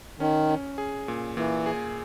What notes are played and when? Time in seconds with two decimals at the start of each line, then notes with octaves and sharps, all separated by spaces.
0.19 D#3 C#4
0.49 C#4
0.78 G#4
1.08 A#2
1.36 A#2 E3
1.66 G#4